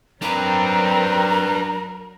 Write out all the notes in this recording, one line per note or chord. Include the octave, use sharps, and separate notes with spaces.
F#3 C4 D4 A#4 B4 A#5